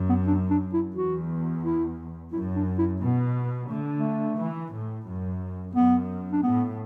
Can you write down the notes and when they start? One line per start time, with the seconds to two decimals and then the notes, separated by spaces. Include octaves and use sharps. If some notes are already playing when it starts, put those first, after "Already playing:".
Already playing: F#2
0.09 B3
0.27 D4
0.50 D4
0.73 E4
0.95 E2 F#4
1.63 E4
2.33 F#2 E4
2.56 D4
2.78 E4
3.02 B2 B3
3.69 D3 A3
3.96 A3
4.38 E3
4.73 A2
5.06 F#2
5.75 F#2 B3
6.32 D4
6.43 A2 B3